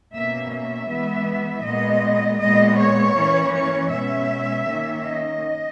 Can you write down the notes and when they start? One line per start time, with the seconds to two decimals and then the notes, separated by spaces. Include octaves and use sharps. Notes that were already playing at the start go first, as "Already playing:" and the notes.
0.13 B2 A#3 C#4 E5
0.51 E5
0.89 E3 G#3 B3
1.64 A#2 G#3 B3 D#5
2.40 A#2 G#3 B3 D#5
2.78 C#5
3.16 E3 A#3 C#4
3.54 C#5
3.91 B2 G#3 C#4 E5
4.67 D#3 A#3 C#4
5.04 D#5